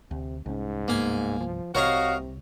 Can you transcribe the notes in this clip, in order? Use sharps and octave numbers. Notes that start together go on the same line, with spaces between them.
D2 C3
C2 G#2 C#4
C2 G2 A#3 B3 G#5
F3
C2 C3 F#4 A#4 C#5 D#5 F5 A#5